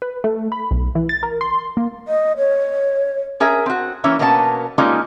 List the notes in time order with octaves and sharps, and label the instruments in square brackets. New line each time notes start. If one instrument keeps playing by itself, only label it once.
[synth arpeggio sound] B4
A3
B5
B1
E3
A6
A#4
C6
A#3
[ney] D#5
C#5
[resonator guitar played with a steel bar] C#4 G#4 A#4 E5
C4 F#4
E3 A#3 C#4 C#5 E5
B2 A#3 B3 C#4 D4 A5
G3 G#3 A#3 C#4 D#4 F4